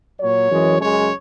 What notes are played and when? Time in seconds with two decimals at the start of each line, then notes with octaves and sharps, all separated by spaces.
0.20 A#2 F#3 C#5
0.51 F#2 E3 G#3
0.80 F#2 C#3 G#3 C#5